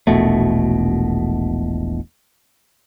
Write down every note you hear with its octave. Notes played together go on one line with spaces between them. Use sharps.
E1 A#1 B2 A3